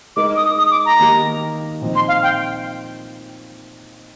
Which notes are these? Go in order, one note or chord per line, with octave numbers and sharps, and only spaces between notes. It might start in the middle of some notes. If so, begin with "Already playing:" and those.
G#3 D#4 A#4 D#5 D6
D#6
D#6
D6
A#5
D#3 A#3 D#4 G4
A#2 F3 C4 D#4
C6
F5
G5